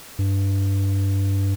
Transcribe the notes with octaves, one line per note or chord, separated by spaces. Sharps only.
G2